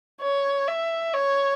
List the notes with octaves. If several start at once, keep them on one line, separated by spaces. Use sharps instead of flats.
C#5
E5
C#5